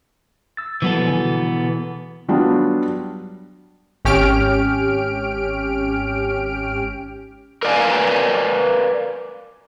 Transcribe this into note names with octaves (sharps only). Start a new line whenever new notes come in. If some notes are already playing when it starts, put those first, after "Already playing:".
E6 A6
B2 E3 F3 G3 B3 A4
B2 D3 G#5
F#3 G3 B3 D4 F4
G#1 C#4 G4 F6 D7
A#4 B4 D5 D#5 F5 G#5